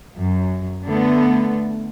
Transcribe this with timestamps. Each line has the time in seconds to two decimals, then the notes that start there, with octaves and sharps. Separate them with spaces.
0.18 F#2
0.87 D3 A3 B3